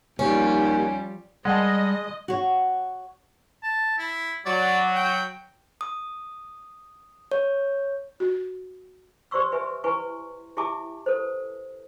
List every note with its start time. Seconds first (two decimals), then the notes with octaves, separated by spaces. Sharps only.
0.19 D#2 F3 G3 C#4 G4
1.45 G3 G#3 D#5 F#5 G5 A5
2.28 F#4 C#5
3.63 A5
3.98 E4
4.46 F#3 D5
4.95 G5
5.81 D#6
7.32 C#5
8.20 F#4
9.31 G4 C5 D5 C6 C#6 E6
9.52 G4 B4 E5 G#5
9.84 E4 B4 G#5 C#6
10.57 E4 G4 E5 G#5 A5 D6
11.06 A4 B4 C5